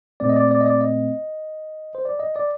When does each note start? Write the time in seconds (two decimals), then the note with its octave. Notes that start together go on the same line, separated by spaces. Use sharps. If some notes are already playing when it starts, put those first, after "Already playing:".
0.20 A#2 A3 C4 D5
0.29 D#5
0.36 D5
0.51 D5
0.61 D#5
0.66 D5
0.81 D#5
1.95 C5
2.05 D5
2.20 D#5
2.36 D5